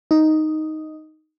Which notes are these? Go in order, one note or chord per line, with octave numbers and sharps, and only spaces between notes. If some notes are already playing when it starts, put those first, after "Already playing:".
D#4